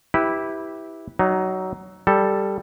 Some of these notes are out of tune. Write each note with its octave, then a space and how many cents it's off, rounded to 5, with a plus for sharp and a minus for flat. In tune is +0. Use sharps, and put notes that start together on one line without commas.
E4 -15 G4 +0 B4 +0
F#3 +20 D#4 +0
G3 +0 A4 +0